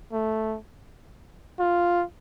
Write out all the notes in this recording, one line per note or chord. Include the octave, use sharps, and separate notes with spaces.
A3
F4